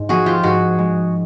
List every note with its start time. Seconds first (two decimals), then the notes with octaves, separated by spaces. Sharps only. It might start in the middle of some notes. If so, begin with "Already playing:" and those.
Already playing: G#2
0.09 F3 F#4 G#4
0.26 F4 G4
0.43 G#2 F#4 G#4
0.79 G#3